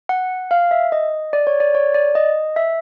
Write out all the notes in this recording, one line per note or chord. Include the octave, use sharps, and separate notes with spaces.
F#5
F5
E5
D#5
D5
C#5
D5
C#5
D5
D#5
E5